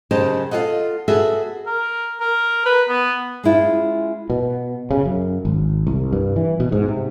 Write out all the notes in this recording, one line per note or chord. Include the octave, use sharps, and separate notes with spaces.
F#2 C#3 G4 C5 D#5 A5
F4 G#4 A4 D#5 F#5
B3 F#4 G#4 A4 E5
A#4
A#4
B4
B3
G#3 C#4 E4 F4
B2
C#3
F#2
G#1
C2
G2
E3
B2
G#2
C3